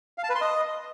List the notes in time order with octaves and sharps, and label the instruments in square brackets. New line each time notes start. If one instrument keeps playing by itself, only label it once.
[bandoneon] F5
A5
B4
C6
D#5